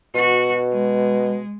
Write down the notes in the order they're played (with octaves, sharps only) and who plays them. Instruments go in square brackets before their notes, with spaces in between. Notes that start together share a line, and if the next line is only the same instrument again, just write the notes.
[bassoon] B2 [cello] F#4
[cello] G#3